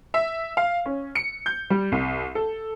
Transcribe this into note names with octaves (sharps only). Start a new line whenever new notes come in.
E5
F5
C#4
C#7
G6
G3
C2
A4